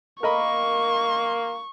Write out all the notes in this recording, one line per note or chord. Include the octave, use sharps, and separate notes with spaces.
A#3 A#4 D#5 B5 C#6